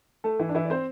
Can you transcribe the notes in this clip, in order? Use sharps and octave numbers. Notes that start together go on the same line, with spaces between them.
A3 A4
E3 E4
D4
E3 E4
D5
C4 C5